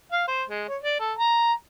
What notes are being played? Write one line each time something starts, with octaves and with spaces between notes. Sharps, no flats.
F5
C5
G#3
C#5
D5
A4
A#5